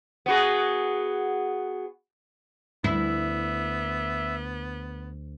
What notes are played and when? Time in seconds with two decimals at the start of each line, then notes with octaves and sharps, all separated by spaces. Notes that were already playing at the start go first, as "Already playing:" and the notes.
0.26 B3 F#4 G#4
2.84 D2 B3 E4 E5